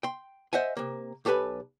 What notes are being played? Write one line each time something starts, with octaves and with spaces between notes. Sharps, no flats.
G5 C6
C5 D#5 E5 F#5 G#5
C3 A#3
B1 G4 A4 B4 G#5 B5